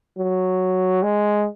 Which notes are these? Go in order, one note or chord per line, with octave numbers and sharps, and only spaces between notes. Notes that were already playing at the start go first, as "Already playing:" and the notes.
F#3
G#3